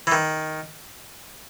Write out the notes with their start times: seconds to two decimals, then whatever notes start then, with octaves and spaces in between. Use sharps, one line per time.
0.07 E3
0.12 D#3